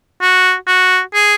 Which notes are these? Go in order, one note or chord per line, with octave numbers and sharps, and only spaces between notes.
F#4
F#4
G#4